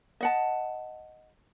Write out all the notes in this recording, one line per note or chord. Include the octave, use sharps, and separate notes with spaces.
D#5 F#5 A5